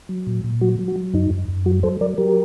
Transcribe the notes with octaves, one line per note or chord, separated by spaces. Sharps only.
F#3
A#2
A#2
F#3 F#4
F#3
F#4
F#3
F#2 D#4
F#2
F#2
F#3 F#4
F#3 A4 C5
F#3 A#4 D5
F#3 G4 A#4